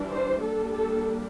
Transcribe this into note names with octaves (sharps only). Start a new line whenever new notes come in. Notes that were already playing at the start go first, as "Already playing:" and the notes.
Already playing: E3 G3 D4
C5
G3 A#3 D4 A4
A4